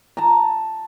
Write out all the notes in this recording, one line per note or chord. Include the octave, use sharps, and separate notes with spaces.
A5 A#5